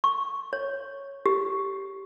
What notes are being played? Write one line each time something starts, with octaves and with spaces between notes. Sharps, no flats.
C#6
C#5
G4